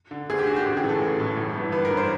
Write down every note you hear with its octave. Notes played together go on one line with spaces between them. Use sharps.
D3
D2 G#4
G4
D3 F#4
G4
A1
G#4
A2 E3
A4
A1
A2 E3
G1
G2 E3
G1 B4
A#4
G2 E3
C5